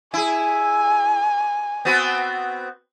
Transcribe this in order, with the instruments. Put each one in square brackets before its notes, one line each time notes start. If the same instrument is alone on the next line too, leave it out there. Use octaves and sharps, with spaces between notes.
[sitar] E4 G#4 [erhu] G#5
[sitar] B3 C4 F#4